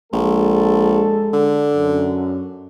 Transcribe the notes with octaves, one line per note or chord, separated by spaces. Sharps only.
A#1 G#3 A4
D3
F#2